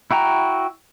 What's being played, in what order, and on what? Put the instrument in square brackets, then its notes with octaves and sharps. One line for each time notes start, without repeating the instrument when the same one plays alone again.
[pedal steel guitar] E4 F#4 G5 A#5